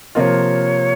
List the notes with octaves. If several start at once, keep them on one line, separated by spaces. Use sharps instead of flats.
C3 F3 A#3 F4 C#5 D#5